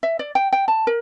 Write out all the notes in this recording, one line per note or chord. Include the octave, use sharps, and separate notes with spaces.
E5
D5
G5
G5
A5
A#4